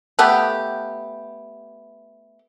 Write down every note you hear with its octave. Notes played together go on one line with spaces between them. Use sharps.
A3 B3 G4